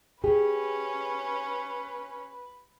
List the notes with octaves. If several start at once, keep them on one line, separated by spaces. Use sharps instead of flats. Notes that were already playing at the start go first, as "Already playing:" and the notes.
C#4 G4 G#4 B4